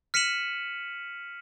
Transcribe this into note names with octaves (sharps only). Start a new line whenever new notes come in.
F6 B6 C#7 D#7 E7 F#7